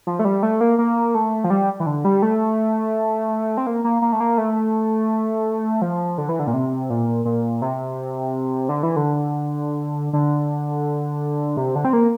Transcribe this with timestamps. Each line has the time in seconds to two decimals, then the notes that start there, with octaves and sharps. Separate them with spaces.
0.07 F3
0.19 A3
0.25 G3
0.43 A3
0.61 A#3
0.78 A#3
1.15 A3
1.44 F3
1.50 G3
1.80 E3
1.86 D3
2.05 G3
2.22 A3
3.57 C4
3.67 A#3
3.84 A#3
4.02 A#3
4.13 A3
4.20 A#3
4.38 A3
5.82 F3
6.18 D3
6.29 E3
6.39 D3
6.47 A#2
6.54 C3
6.90 A#2
7.25 A#2
7.62 C3
8.69 D3
8.83 E3
8.96 D3
10.13 D3
11.57 C3
11.75 D3
11.85 C4
11.93 A#3